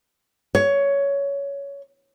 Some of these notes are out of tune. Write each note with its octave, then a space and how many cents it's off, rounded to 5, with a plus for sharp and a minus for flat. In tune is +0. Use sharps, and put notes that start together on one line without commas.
C#5 +15